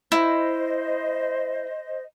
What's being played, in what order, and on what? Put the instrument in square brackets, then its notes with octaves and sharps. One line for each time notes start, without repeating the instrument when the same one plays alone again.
[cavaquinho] E4 [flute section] C5 D#5